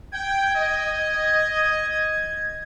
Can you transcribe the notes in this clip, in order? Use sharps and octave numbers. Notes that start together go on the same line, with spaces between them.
G5 G#6
D#5